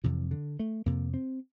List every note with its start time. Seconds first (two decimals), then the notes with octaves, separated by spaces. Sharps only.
0.04 F2 C3 E3
0.31 D3
0.59 A3
0.86 F2 C3 A#3
1.14 C4